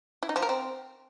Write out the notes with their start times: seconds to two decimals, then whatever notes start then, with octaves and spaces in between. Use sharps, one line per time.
0.23 E4
0.29 D#4
0.36 F3
0.42 A#4
0.49 C4